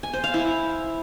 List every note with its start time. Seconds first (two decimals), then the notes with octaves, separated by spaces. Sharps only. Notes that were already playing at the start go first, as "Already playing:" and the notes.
0.03 G#5
0.13 C5
0.24 F5
0.34 E4